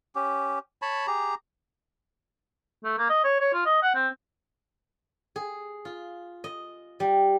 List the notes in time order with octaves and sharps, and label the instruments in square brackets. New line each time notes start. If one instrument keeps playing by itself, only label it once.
[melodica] C#4 G4
C#5 A5 B5
G4 G#4 A#5
[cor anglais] A3
A#3
D#5
C#5
C#5
F4
D#5
F#5
C4
[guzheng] G#4
F4
D#5
G3